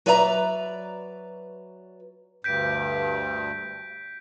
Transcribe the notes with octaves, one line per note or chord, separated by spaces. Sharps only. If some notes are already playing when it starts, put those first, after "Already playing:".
F#3 B4 D5 E5 F5 A#5
D2 G2 G6 B6 D7